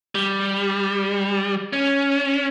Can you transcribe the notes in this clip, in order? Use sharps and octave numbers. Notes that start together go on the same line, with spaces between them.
G3
C#4